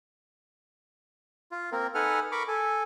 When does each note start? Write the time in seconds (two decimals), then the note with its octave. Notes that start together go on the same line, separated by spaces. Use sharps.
1.52 F4
1.72 A#3 C4 A#4
1.95 D#4 A4 B4 F#5 G#5 F6
2.32 A#4 B5 C#6 D6
2.48 A4 G#5